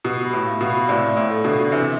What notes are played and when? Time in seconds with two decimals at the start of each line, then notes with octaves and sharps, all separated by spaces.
0.04 B2 G4
0.25 B5
0.33 A2
0.46 F5
0.61 B2
0.68 B5
0.88 A2 C3 D5
1.09 D5
1.16 A2
1.31 A4
1.44 B2 D3
1.52 A4
1.72 C3 E3 D4